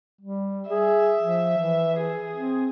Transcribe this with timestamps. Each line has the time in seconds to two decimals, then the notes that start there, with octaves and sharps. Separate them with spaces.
0.21 G3
0.70 G#4 E5
1.21 F3
1.57 E3
1.97 G#4
2.35 C4